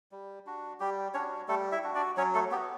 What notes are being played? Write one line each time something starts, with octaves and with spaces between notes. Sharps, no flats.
G3
D4 F#4
G3 G4
C#4 D4 F#4 C#5
G3 A3 A4
E4 E5
D4 F#4
D4 D5
F#3 C#4 C#5
A3 A4
B3 F#4 G4